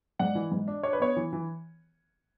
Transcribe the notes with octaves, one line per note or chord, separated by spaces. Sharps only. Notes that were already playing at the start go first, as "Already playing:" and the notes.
G#2 D5 F#5
E3
G#2
D4
D4 C#5
B4
B3 C#5
E3
E3